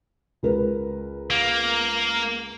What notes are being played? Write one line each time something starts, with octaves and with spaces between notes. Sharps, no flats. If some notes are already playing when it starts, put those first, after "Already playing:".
C#2 A#4 B4
A#3